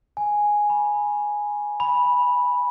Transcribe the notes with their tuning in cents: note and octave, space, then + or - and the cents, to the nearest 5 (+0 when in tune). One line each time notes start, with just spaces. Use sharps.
G#5 +0
B5 -30
B5 -10